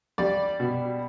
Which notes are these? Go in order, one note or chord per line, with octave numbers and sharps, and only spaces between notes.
G3 D5
B2